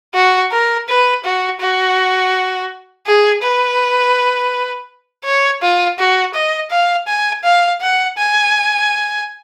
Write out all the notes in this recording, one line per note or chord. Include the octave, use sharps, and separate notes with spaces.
F#4
A#4
B4
F#4
F#4
G#4
B4
C#5
F4
F#4
D#5
F5
G#5
F5
F#5
G#5